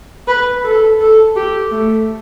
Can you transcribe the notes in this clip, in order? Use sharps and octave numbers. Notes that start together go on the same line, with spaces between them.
B4
A4
A4
G4
A3